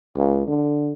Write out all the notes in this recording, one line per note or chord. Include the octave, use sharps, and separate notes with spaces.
C#2
D3